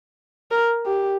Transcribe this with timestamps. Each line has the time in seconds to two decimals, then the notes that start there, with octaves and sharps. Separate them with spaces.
0.51 A#4
0.86 G4